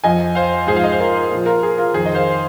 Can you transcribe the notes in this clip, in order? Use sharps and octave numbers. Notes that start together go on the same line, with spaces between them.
F2 F3 D#5 G#5
C5 F5
G#2 F3 G#4 C5
F5
D#5
C5
F4 A#4
A#2 F3
F4 A#4
G#4
F4 A#4
F2 D#3 G#4 C5
D#5
C5 F5